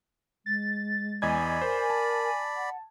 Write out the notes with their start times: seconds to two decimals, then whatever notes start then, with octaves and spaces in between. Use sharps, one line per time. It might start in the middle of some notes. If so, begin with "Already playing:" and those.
0.46 G#3 A6
1.22 E2 D5 D#5 G#5 B5 G#6
1.61 A#4 C5
1.90 A5
2.56 F#5